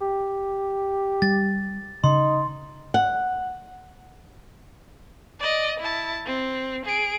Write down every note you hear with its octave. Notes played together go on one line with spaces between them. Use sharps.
G4
G3 A6
C#3 D#4 C6
F#5
D5 D#5
E4 A5
C4
G#4 D7